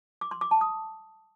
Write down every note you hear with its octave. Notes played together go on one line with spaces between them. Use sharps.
D6
C6
D6
A5
D#6